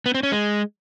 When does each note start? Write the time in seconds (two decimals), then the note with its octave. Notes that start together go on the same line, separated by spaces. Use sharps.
0.06 B3
0.15 C4
0.23 C#4
0.32 G#3